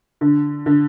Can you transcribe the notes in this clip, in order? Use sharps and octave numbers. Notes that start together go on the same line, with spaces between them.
D3
D3